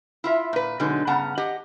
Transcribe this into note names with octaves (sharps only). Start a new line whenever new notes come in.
E4 F4 E5
A#2 B4
B2 D3 F#3 G#3 D#4
G2 C#3 B3 F#5 A5 A#5
G4 D#5 F#5